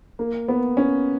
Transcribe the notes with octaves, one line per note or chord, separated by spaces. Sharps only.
A#3
B3
C#4